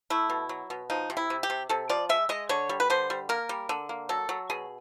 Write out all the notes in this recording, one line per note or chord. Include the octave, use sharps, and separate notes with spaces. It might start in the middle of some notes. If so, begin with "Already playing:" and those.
A3 E4
B2
F#3
B2
F3 D#4
C3
E4
C3
G4
C3
C3 A4
F3 D5
G#3 E5
G#3 D#5
D3 C#5
G3
B4
D3 C5
G3
A#3 A#4
G3
D3
A#3
F#3 A4
F#3
B2 G#4